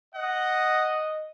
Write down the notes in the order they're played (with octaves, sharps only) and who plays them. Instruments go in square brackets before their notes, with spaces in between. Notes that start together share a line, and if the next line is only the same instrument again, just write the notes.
[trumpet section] D#5 [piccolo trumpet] F#5